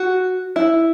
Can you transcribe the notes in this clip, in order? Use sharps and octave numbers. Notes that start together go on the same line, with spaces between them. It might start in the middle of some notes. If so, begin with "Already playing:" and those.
Already playing: F#4
E4